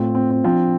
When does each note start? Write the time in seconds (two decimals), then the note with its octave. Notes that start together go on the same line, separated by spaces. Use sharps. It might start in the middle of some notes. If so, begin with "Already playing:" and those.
Already playing: A2 A3 C4 F4
0.15 C4
0.30 C4
0.45 F3 C4 D4 F4